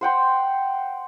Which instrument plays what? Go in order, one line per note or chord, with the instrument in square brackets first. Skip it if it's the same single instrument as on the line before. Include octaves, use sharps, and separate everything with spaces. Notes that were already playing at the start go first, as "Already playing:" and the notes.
[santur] C5 F#5 G5 C6